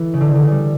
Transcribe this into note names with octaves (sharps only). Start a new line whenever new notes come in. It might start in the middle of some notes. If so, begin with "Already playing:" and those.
Already playing: E3 A3
C#3
D3
C#3
D3
C#3
G3